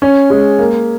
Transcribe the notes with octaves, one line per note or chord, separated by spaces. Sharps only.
C#4
G#3
A#3